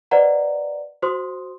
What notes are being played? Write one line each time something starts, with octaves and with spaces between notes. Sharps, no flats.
B4 C5 D5 D#5 F#5 A#5
F#4 C5 C6 D#6